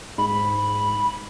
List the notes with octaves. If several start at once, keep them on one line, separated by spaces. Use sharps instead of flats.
G#2 B5